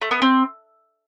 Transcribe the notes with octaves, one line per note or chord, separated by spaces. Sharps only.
A3
B3
C4